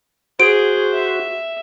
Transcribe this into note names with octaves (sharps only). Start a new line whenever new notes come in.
F#4 G#4 C5 D7
E5